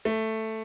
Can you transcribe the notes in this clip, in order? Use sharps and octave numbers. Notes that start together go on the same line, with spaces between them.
A3